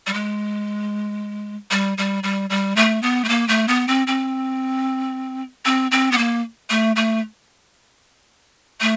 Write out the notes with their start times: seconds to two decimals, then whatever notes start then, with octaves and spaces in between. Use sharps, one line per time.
0.07 G3
0.14 G#3
1.71 G3
1.98 G3
2.23 G3
2.50 G3
2.76 A3
3.02 B3
3.24 A3
3.29 A#3
3.48 A3
3.68 B3
3.88 C4
4.07 C4
5.65 C4
5.91 C4
6.12 B3
6.18 A#3
6.70 A3
6.96 A3
8.81 A3